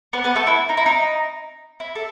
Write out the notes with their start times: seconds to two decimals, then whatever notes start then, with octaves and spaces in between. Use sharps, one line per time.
0.13 B3 B4
0.24 B3 B4
0.36 A3 A4
0.47 E4
0.69 D#4
0.77 E4
0.86 D#4
1.80 E4
1.95 A4